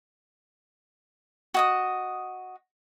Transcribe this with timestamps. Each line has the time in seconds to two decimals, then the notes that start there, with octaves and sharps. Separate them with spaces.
1.54 F#4 D#5 D#6